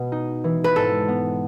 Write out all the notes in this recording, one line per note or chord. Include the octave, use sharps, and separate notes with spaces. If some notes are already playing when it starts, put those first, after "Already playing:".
Already playing: B2 B3
D#4
E3
B4
G#2 A4
B3